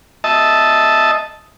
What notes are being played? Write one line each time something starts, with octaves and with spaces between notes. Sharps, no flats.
D#5 E5 A5